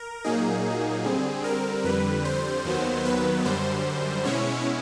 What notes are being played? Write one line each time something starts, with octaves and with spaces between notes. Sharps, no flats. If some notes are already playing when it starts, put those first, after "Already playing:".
Already playing: A#4
A#2 F#3 A#3 D#4 G#4
D3 G3 C4
A#4
F2 D3 G3 B4
C5
D#2 D#3 F#3 B3
B4
F#2 D3 G3 C5
B2 G#3 C#4 E4 C#5